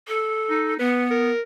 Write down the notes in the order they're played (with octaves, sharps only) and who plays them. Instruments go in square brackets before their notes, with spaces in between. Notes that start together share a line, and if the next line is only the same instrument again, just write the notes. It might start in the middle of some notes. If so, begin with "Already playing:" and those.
[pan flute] A4
[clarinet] D#4
[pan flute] B3 [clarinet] B4
[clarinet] A#4